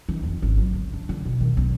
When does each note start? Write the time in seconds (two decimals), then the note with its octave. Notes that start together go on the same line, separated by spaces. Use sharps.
0.09 D#3
0.23 F2
0.42 G#1
0.58 F#3
0.73 D3
0.93 D4
1.09 D3
1.25 B2
1.41 D#3
1.57 B1